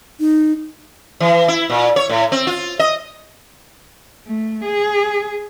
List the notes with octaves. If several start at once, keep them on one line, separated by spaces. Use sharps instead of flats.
D#4
E3
E4
A#2
C#5
A2
C4
F4
D#5
A3
G#4